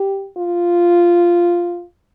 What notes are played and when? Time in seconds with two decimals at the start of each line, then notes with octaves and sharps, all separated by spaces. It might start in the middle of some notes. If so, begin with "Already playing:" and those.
Already playing: G4
0.37 F4